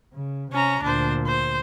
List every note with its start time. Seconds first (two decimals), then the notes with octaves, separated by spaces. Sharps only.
0.14 C#3
0.52 C3 C#4 A#5
0.82 D2 A#2 D4 C5
1.27 C5